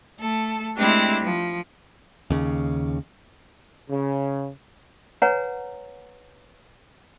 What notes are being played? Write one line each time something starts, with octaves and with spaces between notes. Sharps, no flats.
A3 A4
G#3 A3 C4 D4 E4 G4
F3
D#2 C#3
C#3
B4 C#5 F#5 G#5 A#5